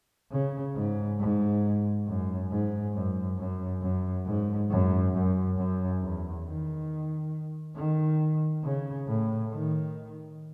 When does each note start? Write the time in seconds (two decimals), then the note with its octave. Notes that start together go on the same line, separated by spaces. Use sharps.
0.32 C#3
0.76 G#2
1.20 G#2
2.07 F#2
2.51 G#2
2.94 F#2
3.38 F#2
3.82 F#2
4.26 G#2
4.70 F#2
5.14 F#2
5.57 F#2
6.01 E2
6.45 D#3
7.76 D#3
8.64 C#3
9.08 A2
9.52 D#3